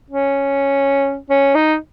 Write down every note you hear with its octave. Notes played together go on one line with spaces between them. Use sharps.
C#4
C#4
D#4